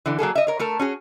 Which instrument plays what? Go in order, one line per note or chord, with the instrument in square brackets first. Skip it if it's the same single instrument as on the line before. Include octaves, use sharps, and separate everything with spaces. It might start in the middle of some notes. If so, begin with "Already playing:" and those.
[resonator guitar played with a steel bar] D3 E3
F#3 A#3 G#4 A4
D#5 E5
A#4 C#5
A3 A4 A#4
C#4 F#4 G#4